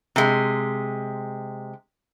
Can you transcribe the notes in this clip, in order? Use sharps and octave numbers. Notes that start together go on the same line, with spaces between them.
C3 G#3